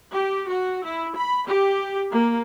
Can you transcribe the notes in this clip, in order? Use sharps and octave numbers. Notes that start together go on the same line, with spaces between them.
G4
F#4
E4
B5
G4
A#3